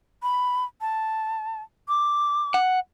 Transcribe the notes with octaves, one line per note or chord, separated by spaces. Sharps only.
B5
A5
D6
F#5